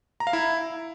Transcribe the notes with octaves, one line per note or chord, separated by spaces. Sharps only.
A#5
F5
E4